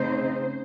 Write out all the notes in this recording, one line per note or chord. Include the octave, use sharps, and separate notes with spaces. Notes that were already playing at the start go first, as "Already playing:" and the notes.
Already playing: C#3 A3 C4 D#4 C5